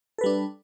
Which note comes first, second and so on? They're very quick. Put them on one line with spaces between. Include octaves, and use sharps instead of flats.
A4 B4 G3 D4